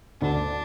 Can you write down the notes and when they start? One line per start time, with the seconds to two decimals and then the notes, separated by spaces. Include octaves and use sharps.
0.21 D2 D4